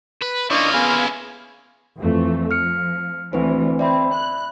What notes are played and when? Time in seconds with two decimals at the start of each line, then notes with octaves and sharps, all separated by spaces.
0.22 B4
0.50 A#3 C#4 D4 E4 F4 C#5 D#5
0.74 B3 G#4 F5
1.98 F2 E3 A3
2.51 F3 F6 C#7
3.33 D2 E3 C4 B4 C5
3.79 C4 D5 E5 B5
4.13 F#6